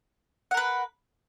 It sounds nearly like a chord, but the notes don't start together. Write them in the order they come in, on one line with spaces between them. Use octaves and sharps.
F#5 A#4 B4